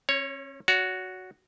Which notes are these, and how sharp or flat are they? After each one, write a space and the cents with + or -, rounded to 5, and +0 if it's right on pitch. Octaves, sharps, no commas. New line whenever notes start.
C#4 -40 C#5 +0
F#4 +0 C#5 +40